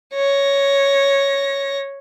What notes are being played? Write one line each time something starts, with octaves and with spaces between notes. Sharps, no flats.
C#5 A#6